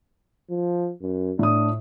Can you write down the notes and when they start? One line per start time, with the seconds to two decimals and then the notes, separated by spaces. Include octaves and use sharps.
0.50 F3
1.02 F#2
1.39 A2 D4 D#6